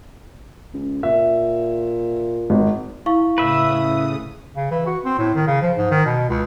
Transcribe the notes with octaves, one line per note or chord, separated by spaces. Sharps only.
C#2
A#2 E5
G#1
E4 F5 C#6
A2 C#3 B4 E5 D#6
C#3
E3
F#4
C4
A2
D#3
C#3
F3
G#2
D#3
B2
C#2